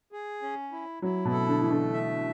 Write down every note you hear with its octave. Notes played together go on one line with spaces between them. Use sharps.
G#4
C#4
E4
F#3 E4
B2
A4
D3
E3 A3
D3
E5